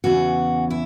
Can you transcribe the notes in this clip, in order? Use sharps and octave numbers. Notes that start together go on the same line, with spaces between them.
E2 C#3 E3 F#4
E4